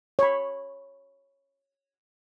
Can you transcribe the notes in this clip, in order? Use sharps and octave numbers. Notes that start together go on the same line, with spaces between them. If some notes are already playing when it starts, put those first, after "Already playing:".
C#5 B5